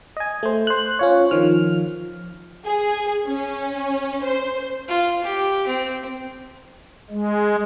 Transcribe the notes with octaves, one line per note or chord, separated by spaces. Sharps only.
D#5 G#5
A3 C5
C5 F#6
C#4 F4 C#5
D#3 F3 F6
G#4
C#4
C5
F4
G4
C4
G#3